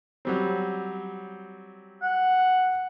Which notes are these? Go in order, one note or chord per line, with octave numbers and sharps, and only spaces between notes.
F#3 G3 C4
F#5